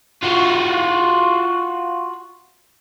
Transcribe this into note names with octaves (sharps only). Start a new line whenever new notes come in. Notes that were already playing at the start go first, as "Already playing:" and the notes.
F4 F#4